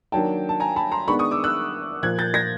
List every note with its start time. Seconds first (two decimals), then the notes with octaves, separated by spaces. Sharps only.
0.12 D#3 F#3 A#3 D4 G5 A5
0.49 A5
0.60 G#5 A#5
0.76 A5 B5
0.92 A#5 C6
1.08 D#3 G#3 B3 D4 B5 C#6
1.19 C#6 D#6
1.31 D6 E6
1.44 E6 F#6
2.03 A#2 F3 A#3 F#6 G#6
2.19 G6 A6
2.34 G#6 A#6